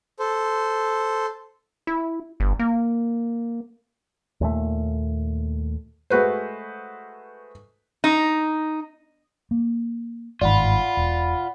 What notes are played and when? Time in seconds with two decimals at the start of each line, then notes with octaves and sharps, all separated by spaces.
0.19 A4 C5
1.87 E4
2.40 G1
2.59 A#3
4.41 D#2 A#2 A3
6.10 G#3 A3 F#4 B4 C5
8.04 D#4
9.51 A#3
10.41 G1 G#2 D#3 F4 D5 F#5 B5
10.97 E1